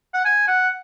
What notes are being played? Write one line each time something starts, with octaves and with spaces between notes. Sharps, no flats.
F#5
G#5
F#5